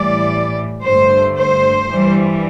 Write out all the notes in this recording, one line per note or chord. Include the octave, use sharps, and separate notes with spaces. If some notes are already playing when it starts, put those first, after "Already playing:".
Already playing: A2 E3 G3 D5
G2 D3 A3 C5
C5
G2 E3 G3